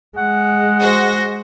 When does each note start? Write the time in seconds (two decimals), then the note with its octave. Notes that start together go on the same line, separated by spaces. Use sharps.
0.18 G#3 F#5
0.80 F#4 C5 A#6